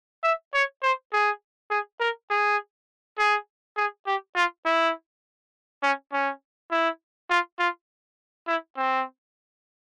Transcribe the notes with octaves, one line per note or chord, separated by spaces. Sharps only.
E5
C#5
C5
G#4
G#4
A#4
G#4
G#4
G#4
G4
F4
E4
C#4
C#4
E4
F4
F4
E4
C4